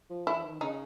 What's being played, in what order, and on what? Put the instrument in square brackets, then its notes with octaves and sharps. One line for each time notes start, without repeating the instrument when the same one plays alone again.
[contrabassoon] F3
[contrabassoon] E3 [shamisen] E4
[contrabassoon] D#3
[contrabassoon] C#3 [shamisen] D#4